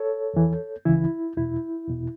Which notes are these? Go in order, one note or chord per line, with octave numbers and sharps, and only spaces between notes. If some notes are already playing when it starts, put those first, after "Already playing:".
Already playing: A4 C#5
E2 E3
C#2 C#3 E3 E4
E2 B2 E4
E2 B2